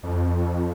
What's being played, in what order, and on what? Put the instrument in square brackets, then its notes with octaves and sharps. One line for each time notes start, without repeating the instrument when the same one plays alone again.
[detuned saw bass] F2